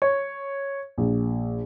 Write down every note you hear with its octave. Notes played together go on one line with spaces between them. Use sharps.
C#5
A#1